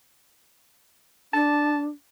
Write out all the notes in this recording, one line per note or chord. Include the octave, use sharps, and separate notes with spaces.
D4 A5